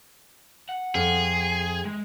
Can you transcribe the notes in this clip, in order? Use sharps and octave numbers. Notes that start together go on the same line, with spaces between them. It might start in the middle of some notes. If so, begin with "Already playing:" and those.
F#5
F2 G#4
G#3